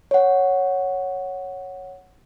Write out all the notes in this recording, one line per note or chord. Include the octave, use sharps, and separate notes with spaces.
C#5 F#5